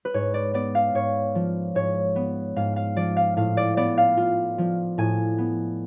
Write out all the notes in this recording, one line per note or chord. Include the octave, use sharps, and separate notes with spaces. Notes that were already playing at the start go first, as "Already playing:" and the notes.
B4
G#2 C#5
D5
B3 D5
F5
G#2 C#5
F3
G#2 C#5
B3
G#2 F5
F5
F3 D5
F5
A2 F5
D5
B3 D5
F5
F4
F3
A2 G#5
B3